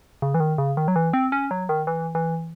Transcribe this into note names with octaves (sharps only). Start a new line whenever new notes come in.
C#3
E3
D#3
C#3
D#3
F#3
E3
C4
C#4
F#3
D#3
E3
E3